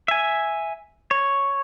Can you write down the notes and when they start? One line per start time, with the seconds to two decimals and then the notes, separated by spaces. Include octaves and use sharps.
0.08 E5 G#5
1.11 C#5